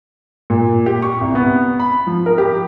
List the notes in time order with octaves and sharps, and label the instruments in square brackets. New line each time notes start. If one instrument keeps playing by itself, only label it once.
[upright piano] A#2
G4
C#6
C2
B3
B5
F3
A#4
G4